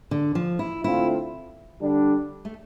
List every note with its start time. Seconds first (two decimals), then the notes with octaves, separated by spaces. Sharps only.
0.11 D3
0.35 F3
0.59 E4
0.84 D3 A3 C4 E4 F4
1.81 D3 G3 D4
2.45 A3